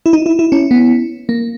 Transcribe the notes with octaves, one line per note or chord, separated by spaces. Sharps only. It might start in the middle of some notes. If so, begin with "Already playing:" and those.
E4
D#4
E4
E4
C#4
B3
A#3